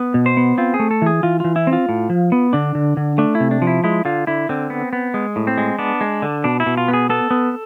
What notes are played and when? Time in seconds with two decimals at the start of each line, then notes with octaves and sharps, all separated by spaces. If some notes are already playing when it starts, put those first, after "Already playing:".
Already playing: B3
0.14 B2
0.26 C5
0.37 B3
0.58 C4 F4
0.74 G#4
0.80 A3
0.91 A4
1.02 E3 G#4
1.23 E3 F4
1.40 E3 F4
1.56 E4
1.67 C4
1.73 F4
1.89 A2
2.10 F3
2.32 B3
2.53 D3 D4
2.75 D3
2.97 D3
3.18 A3 D4
3.35 E4
3.40 C3
3.51 D4
3.62 F3
3.67 E4
3.84 G#3 E4
4.05 D3 F4
4.27 D3 E4
4.49 D3 C4
4.70 B3
4.93 B3
5.14 G#3
5.36 A2
5.47 C4
5.58 G#3
5.79 B3 D4
6.01 G#3
6.22 D3
6.44 B2 D4
6.60 E4
6.66 B2
6.77 F4
6.88 B3
6.93 G#4
7.10 B3 A4
7.31 B3